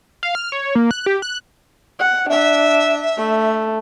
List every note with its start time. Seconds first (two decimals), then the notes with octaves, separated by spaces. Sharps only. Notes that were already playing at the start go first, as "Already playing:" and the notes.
0.23 F5
0.35 F6
0.52 C#5
0.75 A#3
0.91 F#6
1.06 G4
1.22 F#6
1.99 F#5
2.29 D4 E5
3.17 A3